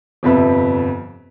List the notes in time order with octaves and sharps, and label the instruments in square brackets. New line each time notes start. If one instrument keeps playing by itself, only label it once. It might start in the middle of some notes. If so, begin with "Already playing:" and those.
[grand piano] G1 F2 C3 B4 E5